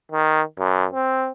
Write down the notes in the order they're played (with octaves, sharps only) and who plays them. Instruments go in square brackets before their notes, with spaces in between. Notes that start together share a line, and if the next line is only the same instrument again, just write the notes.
[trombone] D#3
F#2
C4